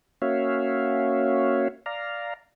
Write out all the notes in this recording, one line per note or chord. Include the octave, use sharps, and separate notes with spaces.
A#3 C#4 F#4 C#5 E5 F5
D5 F5 A#5